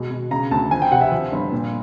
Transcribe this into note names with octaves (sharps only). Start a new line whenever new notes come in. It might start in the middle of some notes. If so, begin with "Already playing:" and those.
Already playing: B2 G#3
B2
C#3 A#5
D2 A5
F3 G#5
G5
C3 F#5
E5
F3
G1
A#2